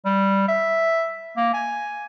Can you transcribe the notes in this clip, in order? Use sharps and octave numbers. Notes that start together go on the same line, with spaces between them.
G3
E5
A#3
G#5